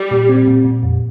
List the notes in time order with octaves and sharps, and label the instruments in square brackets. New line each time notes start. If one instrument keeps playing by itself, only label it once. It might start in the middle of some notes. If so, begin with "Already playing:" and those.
Already playing: [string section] G3
[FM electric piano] A#2
C4
A#2
A#2
F2